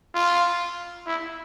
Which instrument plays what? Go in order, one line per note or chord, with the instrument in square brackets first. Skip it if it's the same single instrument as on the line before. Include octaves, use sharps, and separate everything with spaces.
[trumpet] F4
E4